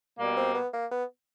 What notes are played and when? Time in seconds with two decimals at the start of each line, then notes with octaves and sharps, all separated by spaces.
0.18 B2 G3 A#3
0.37 C4
0.55 B3
0.73 A#3
0.91 B3